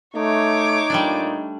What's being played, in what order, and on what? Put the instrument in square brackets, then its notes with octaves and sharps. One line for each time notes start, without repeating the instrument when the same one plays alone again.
[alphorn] A3 [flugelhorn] D#4 [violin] C#5 D6
[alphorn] A#2 [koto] G3 A3 D4